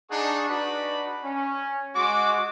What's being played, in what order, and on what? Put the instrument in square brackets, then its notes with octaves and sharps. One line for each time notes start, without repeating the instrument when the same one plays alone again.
[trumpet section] D4 D#4 G#4 F#5 C#6
D4 D#4 F#4 B4 D5 B5
C#4
G#3 F#4 D6